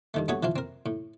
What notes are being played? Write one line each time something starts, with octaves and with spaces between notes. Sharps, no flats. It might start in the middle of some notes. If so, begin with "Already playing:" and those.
G2 D#3 A3
G2 A3 B3 F#4 G#4 C#5
E3 F3 E4 F4
C4 A#4
A2